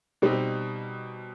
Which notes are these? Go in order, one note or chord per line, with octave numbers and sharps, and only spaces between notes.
B2 G3 C4 D#4